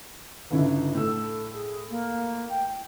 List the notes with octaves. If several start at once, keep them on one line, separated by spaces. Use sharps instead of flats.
G1 C#3 D#4 E4
A2 A4 E6
G#4
A#3
G5